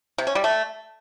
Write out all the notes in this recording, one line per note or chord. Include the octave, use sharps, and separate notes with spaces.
C3
C#4
G3
A3